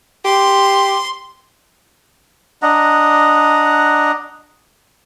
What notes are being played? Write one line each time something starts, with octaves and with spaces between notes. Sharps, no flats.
G4 C6
D4 D#5 F#5 A#5